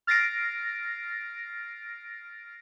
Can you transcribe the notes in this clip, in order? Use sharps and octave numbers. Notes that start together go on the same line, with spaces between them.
F6 A6 A#6 C7 D7